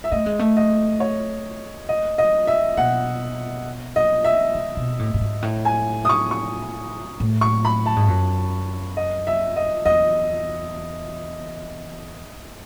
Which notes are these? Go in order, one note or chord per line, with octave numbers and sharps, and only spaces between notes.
E5
A3 D#5
G#3
A3
D#5
C#5
D#5
D#5
E5
B2 F#5
D#5
E5
C#3
B2
A2
A2
G#2
A2
G#5
D#6
C#6
C#6
A2
C#6
B5
A5
G#2
F#2
D#5
E5
D#5
E2 D#5